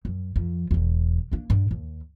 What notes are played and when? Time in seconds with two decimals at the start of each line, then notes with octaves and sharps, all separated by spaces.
0.05 F#2
0.36 F2 F3
0.71 E1 E2
1.32 A#3 D4
1.50 G2 D4
1.71 D#2